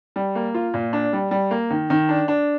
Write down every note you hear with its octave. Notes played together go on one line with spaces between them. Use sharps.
G3
A#3
F4
A#2
D4
G3
G3
A#3
D#3
D#3
D4
D4